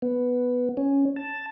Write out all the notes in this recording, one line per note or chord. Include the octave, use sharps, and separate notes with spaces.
B3
C#4
A5